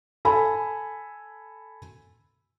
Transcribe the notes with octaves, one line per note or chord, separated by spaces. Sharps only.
A4 G#5 B5